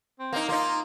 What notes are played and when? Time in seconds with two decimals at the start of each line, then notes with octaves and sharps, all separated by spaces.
0.19 C4
0.33 A#3 D#4
0.49 A#3 D#4 F4